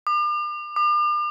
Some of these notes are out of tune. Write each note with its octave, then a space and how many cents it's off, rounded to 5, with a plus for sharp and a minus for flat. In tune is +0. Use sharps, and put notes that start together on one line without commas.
D6 +40
D6 +40